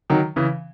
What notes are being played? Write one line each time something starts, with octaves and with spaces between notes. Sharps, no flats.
D#3 F#3
C#3 E3